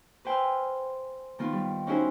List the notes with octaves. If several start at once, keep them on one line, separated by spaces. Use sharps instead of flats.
B4 C5 G5 G#5 E6 F6
D#3 B3 F4
G3
C#4 D#4 E4 F#4 G#4 C5